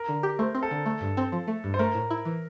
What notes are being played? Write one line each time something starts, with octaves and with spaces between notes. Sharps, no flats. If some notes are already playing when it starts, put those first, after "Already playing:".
Already playing: A#4
D3
G4
A3 C5
C4
A4
D3
A3
G2
C4
F3
A3
G2
C5
A3 A#4
A2
E4
E3